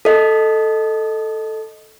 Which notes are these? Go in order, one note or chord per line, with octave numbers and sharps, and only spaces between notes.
A4 D#5